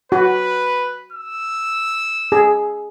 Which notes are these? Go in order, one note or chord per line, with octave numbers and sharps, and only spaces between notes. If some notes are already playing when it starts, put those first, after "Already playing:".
F#4 B4
E6
G#4